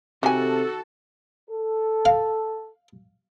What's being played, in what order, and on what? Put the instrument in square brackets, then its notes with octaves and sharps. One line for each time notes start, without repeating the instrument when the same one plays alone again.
[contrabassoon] C3 [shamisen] D#3 G#5 [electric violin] F#4 [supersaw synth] A4
[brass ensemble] A4
[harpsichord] F5